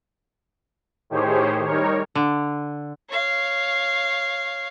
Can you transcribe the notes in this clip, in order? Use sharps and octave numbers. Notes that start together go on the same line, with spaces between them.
A2 D#3 G4 G#4 C5 C#5
G3 D#4 A#4 C#5
D3
C#5 F5